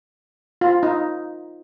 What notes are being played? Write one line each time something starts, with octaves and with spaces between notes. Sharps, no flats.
F4
D#4